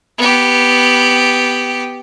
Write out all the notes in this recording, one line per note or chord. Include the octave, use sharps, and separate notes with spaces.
B3 G4